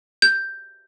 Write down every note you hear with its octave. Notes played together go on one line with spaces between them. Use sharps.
G6